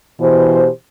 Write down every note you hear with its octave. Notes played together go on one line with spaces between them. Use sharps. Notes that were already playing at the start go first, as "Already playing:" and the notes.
B2 E3 G4 C5